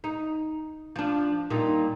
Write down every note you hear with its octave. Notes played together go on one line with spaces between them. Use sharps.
D#4
F3 D4
A#2 G3 D#4